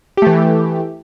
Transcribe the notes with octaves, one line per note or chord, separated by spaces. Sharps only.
E3 A3 G4